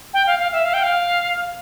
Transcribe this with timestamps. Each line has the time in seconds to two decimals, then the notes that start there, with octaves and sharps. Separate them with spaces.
0.14 G5
0.27 F5
0.39 F5
0.53 E5
0.65 F5
0.74 G5
0.83 F5